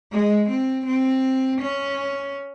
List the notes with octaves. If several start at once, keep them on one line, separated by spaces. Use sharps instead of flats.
G#3
C4
C4
C#4